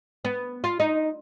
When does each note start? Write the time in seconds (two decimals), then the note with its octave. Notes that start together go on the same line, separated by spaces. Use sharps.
0.25 B3
0.64 F4
0.80 D#4